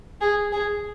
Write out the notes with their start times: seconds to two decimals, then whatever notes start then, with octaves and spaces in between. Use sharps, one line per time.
0.21 G#4
0.52 G#4